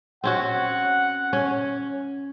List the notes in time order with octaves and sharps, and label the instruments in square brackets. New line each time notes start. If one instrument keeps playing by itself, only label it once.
[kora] C4 C#4 F#4 [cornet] F#5
[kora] C#4